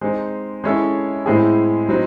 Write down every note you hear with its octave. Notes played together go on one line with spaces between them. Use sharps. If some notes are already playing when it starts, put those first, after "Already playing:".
G#3 C4 D#4
G#3 C#4 E4 A4 C#5
A2 G#3 C4 E4 G#4
F#3 C4 D#4